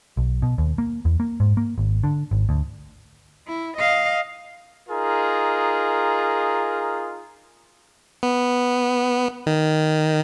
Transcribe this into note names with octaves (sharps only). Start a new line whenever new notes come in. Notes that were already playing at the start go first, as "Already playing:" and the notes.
B1
B2
D#2
A#3
E2
A#3
G#2
A#3
G#1
D3
G#1
D2
E4
D#5 F5
D#4 F4 G#4 A#4
B3
D#3